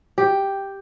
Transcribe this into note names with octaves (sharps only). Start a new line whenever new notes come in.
G4